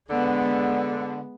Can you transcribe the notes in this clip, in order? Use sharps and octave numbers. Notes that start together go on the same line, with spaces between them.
D3 G#3 B3